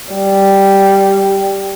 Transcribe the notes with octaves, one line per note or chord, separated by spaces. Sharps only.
G3